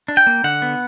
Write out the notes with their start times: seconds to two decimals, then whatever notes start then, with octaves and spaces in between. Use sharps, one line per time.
0.08 D4
0.17 G5
0.27 A#3
0.44 D3 F#5
0.62 B3